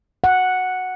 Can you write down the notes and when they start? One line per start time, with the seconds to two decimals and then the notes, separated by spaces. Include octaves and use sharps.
0.24 F#5